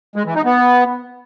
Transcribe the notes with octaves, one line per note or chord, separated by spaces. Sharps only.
G#3
E3
D#4
B3